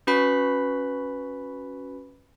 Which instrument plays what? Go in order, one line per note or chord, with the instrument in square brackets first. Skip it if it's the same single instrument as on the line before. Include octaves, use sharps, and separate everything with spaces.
[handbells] C#4 F#4 B4 B5 B6